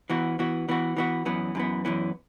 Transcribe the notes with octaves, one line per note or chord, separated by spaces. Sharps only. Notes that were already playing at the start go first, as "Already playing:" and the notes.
E3 B3 F#4
E3 B3 F#4
E3 B3 F#4
E3 B3 F#4
F#2 E3 B3
F#2 E3 B3
F#2 E3 B3